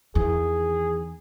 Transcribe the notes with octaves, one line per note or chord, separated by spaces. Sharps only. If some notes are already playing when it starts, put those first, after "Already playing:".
E2 D#3 G#4